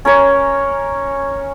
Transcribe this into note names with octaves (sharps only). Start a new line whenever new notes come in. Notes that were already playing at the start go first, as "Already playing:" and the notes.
C#4 A#4 C#5